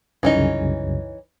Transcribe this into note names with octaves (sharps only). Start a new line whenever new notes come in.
C2 F#2 C#3 E3 C#4 D#4